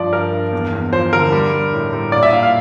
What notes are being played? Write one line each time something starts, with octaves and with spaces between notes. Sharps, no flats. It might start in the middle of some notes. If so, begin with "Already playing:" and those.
Already playing: G2 F3 D5
G2 A#4
G2
E2
E2
F3 C5
D3 A#4
G3
G3
A2
G3
A#2 D5
E5
A#2 F5
F5